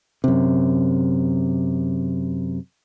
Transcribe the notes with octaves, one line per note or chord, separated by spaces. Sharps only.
F#2 C3